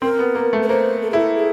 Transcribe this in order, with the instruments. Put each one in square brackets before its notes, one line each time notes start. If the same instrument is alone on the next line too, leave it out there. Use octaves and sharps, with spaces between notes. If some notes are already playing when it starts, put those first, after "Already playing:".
[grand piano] C4 [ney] A#4
[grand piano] B3
A#3
A3
[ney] B4
[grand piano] A#3 [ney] C5
[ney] A4
[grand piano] E4 [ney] G#4
[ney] A4
G#4